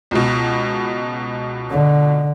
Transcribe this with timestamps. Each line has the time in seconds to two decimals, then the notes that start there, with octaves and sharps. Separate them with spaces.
0.11 C#2 B2
1.71 D3